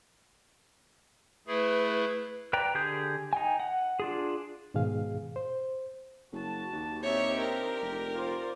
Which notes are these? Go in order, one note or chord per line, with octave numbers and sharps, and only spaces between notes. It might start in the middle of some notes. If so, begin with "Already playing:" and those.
A3 E4 G#4 B4
B4 D5 G5 A#5
D3 G4 G#4 D#6 G6
D#4 G5 G#5
F#5
D4 F4 G#4
G#2 B2 D#3 G#4 F5
C5
F#1 F#4 A5
D#2
A#2 C4 D4 D#4 G4 C#5 E5
A#4
F1
F4 C5 D5